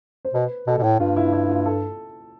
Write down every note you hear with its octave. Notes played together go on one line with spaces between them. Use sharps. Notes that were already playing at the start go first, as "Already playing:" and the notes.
C5
B2 B4
B2 A4
B2
A2
G2 F4
E4
E4
F4
A4